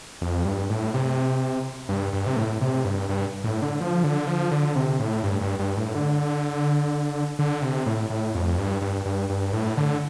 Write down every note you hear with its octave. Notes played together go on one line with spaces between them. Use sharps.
F2
G2
A2
C3
G2
G2
C3
A2
C3
G2
G2
A2
D3
F3
D3
F3
D3
C3
A2
G2
G2
G2
A2
D3
D3
C3
A2
A2
F2
G2
G2
G2
G2
A2
D3